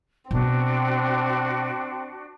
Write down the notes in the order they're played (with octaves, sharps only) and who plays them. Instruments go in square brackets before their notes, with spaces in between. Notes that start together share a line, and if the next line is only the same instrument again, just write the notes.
[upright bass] B2 B3 [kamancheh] C4 [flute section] D4 F#4